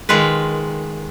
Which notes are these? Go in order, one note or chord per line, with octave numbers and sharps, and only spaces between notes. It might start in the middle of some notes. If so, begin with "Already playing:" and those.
D#3 G#3 F4 B4